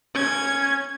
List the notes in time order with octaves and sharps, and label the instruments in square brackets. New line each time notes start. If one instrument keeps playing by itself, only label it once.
[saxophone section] C#4 [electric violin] G#6